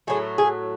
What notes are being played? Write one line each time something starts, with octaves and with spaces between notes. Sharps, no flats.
A2 F#3 A3 G#4
G#4